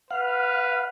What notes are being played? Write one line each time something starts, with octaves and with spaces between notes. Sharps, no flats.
B4 F5 F#5